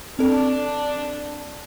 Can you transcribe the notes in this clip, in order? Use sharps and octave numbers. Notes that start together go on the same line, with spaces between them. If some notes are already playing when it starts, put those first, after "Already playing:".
C4 D4 A4